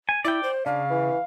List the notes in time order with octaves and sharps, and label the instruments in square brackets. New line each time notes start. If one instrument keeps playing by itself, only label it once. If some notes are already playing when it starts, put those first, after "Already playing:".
[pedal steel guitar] G#5
[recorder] E4 [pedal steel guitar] D5 G5
[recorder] C5
[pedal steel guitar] C#3 [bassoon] D4 [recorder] F5
[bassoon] E3